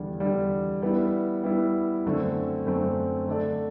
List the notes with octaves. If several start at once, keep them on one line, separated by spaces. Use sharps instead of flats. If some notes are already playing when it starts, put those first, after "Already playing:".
Already playing: E2 D3 G3
E2 D3 G3
G3 B3 E4
G3 B3 E4
F#2 D3 A3 C4
F#2 D3 A3 C4
D3 A3 D4 A4 D5